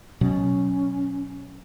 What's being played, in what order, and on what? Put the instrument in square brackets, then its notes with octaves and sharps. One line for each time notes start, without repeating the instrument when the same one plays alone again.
[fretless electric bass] B2 F#3 [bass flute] C#4